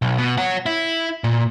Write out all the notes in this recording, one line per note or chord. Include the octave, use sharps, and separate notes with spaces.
B1
B2
C#5 F#5
E4
A#2